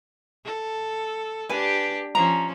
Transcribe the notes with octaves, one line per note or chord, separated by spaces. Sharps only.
A4
D4 G4 B4 G#5
F3 C#4 A#5